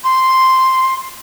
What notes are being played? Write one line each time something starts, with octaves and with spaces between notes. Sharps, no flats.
C6